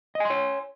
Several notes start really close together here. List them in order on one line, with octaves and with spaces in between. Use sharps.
D#5 G#5 C6 C#5